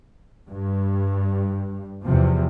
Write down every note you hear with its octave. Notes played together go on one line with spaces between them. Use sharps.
G2
E2 C3 F3